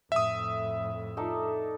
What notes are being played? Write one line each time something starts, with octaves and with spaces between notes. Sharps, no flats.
F2 A2 E5 D#6
D#4 A4 D5